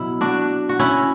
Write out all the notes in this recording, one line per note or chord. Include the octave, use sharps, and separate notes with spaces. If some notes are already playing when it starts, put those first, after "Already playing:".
Already playing: B2 F#3 E4
D4 F#4
F#4
C#4 E4